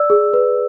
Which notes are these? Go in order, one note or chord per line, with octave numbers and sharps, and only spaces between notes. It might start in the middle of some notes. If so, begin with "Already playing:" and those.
Already playing: D5 E6
G#4
B4